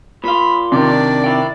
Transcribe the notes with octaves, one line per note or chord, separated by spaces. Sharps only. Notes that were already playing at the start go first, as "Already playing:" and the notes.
A#2 F4 B5
C3 D#3 D4 D5
E4 G5